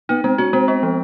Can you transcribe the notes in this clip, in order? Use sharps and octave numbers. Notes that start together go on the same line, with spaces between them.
B3 D#4
G#3 C4
C#4 F#4
G#3 C4
B3
F3